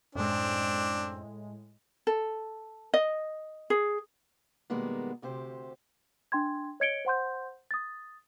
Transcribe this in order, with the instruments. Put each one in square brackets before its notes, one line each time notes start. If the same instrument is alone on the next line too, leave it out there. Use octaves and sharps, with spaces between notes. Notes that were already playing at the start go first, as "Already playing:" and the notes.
[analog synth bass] F#2 [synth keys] A2 G#3 [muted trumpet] C4 [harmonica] D4
[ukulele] A4
D#5
G#4
[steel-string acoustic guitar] B2 D#3 G3 G#3 A#3 B3
D2 C3 G4 C5
[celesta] D4 G5 C6 G#6
C#5 D#5 G#6 C#7 D7 G7
C5 F#5 C6 G6
D#6 A6